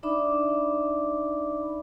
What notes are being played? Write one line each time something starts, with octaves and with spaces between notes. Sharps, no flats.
D4 D#4 D5 E5 B5 D6